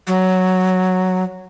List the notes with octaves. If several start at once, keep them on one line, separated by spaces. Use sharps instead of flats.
F#3